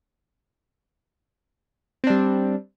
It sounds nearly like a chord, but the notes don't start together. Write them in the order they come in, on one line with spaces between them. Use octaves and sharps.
C4 D4 G3